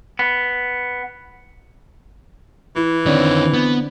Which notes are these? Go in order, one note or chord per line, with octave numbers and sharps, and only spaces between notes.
B3
E3 E4
D3 D#3 C4 C#5 D5
B3